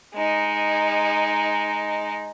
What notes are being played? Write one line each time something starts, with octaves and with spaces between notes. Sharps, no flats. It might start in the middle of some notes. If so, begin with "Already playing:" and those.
G#3 D#4